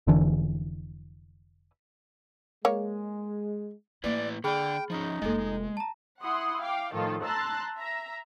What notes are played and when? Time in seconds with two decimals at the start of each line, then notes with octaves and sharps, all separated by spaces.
0.07 F1 D3 E3 D4
2.65 G#3 A#3 C#5
4.04 A2 A#3 E4 B4 D5
4.44 D3 G#4 D5 G5 B5 F6
4.90 F3 C#4 D#4
5.22 F1 G#3 A#3 A4 D#5
5.77 A5 A#5
6.22 E4 F#5 C6 D#6
6.62 F5 G5 D6
6.93 A2 D#3 F3 F4 A4
7.24 A5 A#5 C6 E6 F#6 A6
7.77 E5 A#5